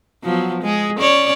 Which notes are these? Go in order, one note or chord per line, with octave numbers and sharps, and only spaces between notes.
F3 F#3 B3
G#3 G#4
C#4 C#5 D5